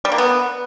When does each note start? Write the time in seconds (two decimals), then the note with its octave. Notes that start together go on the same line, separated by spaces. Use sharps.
0.05 G3
0.12 A#3
0.18 B3